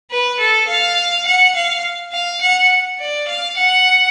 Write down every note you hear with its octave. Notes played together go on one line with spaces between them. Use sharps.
B4
A4
F5
F#5
F5
F5
F#5
D5
F5
F#5